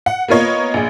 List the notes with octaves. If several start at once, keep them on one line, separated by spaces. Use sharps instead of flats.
F#5
A#3 B3 F4 A#4 C#5 D#5
A#1 G#4